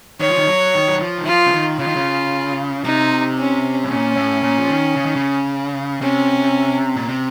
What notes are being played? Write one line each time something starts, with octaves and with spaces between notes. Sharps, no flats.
D#3 C#5
F3
D#3
F#3
D#3
F#3
F3
D#3
F3 F4
C#3
D#3
C#3 F4
D#3
C#3
C3 D#4
C#4
A2
A#2 C#4
A2
A#2
F3
D#3
C#3
D#3
C#3
C3 C#4
A#2
C3